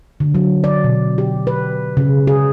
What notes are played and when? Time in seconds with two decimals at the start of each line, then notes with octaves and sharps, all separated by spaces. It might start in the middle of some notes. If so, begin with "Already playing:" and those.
0.20 D3
0.35 F#3
0.64 D5
0.84 B2
1.18 G4
1.47 B4
1.97 C#3
2.27 G#4